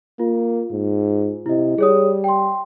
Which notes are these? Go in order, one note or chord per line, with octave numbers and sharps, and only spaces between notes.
A#3 F4
G#2
C3 E4 D#5
G3 G#4 C#5 D#6
G5 C6